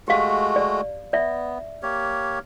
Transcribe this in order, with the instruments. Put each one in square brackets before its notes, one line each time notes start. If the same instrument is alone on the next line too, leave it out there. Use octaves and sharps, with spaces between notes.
[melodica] G#3 A3 F#4 [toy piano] G4 F5
[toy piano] D5
[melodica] B3 [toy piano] D5 E5
[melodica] A#3 G4 C#5